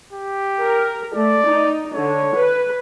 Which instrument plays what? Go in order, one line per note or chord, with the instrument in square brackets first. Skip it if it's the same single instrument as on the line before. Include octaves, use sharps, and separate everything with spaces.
[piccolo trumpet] G4
[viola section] A#4
[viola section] A3 [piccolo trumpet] D5
[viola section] D#4
[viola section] D3 [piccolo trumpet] C#5
[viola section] B4